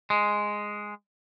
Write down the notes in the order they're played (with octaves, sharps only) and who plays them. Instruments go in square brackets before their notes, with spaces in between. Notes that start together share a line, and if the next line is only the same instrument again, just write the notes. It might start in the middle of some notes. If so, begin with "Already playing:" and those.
[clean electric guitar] G#3